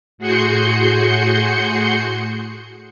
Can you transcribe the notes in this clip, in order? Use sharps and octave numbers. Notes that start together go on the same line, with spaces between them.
A2 F#4 G#4 C6 G6 C#7